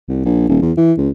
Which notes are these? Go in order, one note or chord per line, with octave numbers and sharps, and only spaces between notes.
C2
A#1
D#1
E2
E3
C#2